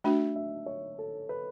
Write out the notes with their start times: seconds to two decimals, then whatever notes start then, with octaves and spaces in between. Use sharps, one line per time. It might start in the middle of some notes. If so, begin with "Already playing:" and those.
0.04 A3 D4 F#4 E5
0.36 E5
0.66 C#5
0.98 A4
1.29 B4